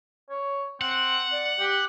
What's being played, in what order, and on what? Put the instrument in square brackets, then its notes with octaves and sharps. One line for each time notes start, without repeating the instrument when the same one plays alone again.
[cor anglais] C#5
[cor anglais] C4 [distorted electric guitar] F#5
[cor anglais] D5
G4